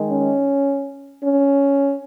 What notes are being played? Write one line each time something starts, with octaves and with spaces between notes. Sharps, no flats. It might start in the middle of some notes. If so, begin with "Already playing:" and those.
Already playing: D#3 G#3
C#4
C#4